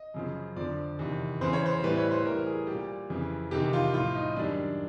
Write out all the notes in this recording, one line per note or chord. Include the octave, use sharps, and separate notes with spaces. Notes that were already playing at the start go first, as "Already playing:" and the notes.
Already playing: D#5
F#2 C#3 F3
F2 D3 F3 D5
E2 C3 D#3
E2 C#3 E3 C5
C#5
C5
A2 E3 G3 B4
C#5
C5
A2 E3 G3 A#4
G#4
A#2 G3 G4
F2 C#3 E3
E2 C3 D#3 G4
F4
A2 F3 F4
D#4
F#2 D#3 G3 D4